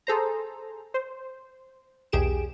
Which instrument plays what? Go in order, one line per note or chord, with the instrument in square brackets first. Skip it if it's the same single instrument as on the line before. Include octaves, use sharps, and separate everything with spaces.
[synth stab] G#4 A4 C5 A#5
C5
B1 E2 G4 G#4 D7 E7